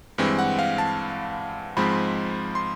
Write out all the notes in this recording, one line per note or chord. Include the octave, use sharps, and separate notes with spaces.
G2 E3 G#3 C4
F#5
F5
A5
G#2 F3 G#3 C4 B5
C6